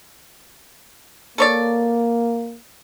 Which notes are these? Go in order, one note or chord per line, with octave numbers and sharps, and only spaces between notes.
A#3 A4 C#5 D5